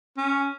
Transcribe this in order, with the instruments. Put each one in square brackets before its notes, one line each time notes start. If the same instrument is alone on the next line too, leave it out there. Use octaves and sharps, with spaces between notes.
[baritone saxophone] C#4